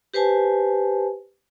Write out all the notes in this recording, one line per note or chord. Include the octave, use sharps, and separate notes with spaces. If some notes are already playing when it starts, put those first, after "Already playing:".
G4 B4 C5 G#5 A5